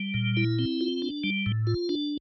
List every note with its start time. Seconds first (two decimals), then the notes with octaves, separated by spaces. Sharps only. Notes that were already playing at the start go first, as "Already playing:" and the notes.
Already playing: G3
0.14 A#2
0.37 E4
0.59 C4
0.81 F4
1.02 D4
1.24 G3
1.46 A2
1.67 F4
1.89 D4